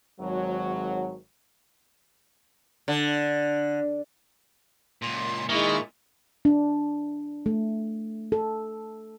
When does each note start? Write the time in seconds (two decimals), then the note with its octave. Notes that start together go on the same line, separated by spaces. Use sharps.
0.20 G#1 F#3
2.88 D3
5.02 C#2 A#2 C6
5.49 A#2 D#3 G#3 E4 C#6
6.45 D4
7.46 A3
8.32 A4